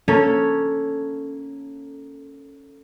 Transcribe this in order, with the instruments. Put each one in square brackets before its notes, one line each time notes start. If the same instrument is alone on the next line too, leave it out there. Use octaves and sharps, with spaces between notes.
[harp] A#3 C#4 A4 C#5